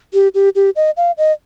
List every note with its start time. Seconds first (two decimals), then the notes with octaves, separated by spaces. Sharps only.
0.14 G4
0.35 G4
0.55 G4
0.76 D#5
0.97 F5
1.18 D#5